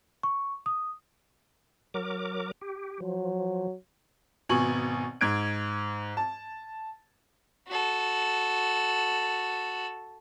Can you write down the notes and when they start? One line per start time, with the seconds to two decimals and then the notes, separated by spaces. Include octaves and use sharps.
0.23 C#6
0.66 D#6
1.94 F#3 A#4 D6
2.61 G4
3.00 F3 F#3
4.49 G#1 B2 G#5 C#6 F#7
5.21 G#2 G#6 D7
6.17 A5
7.68 F#4 A4